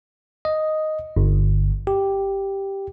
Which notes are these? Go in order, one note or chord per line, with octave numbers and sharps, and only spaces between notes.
D#5
G1
G4